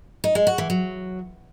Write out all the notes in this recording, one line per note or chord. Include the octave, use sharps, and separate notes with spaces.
D#4
G#3
F#4
E3
F#3